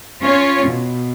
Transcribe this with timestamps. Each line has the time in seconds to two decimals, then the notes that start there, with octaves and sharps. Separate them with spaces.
0.21 C#4 F4 C#5
0.66 B2